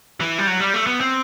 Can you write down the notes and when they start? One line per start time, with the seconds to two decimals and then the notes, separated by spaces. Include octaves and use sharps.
0.20 E3
0.38 G3
0.47 F#3
0.60 G3
0.74 A3
0.87 B3
1.01 C4